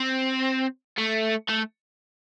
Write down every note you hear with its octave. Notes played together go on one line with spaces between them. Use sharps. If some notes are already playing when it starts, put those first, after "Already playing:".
Already playing: C4
A3
A3